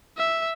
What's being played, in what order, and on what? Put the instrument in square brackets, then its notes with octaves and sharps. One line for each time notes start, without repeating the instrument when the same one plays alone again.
[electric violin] E5